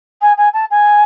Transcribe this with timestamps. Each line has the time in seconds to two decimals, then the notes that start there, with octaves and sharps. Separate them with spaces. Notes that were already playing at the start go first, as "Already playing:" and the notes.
0.22 G#5
0.37 G#5
0.53 A5
0.71 G#5